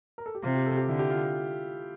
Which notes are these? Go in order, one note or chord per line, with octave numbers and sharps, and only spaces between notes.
A#4
A4
G4
C3 F4
G4
A4
G4
D3 E4
G4
F4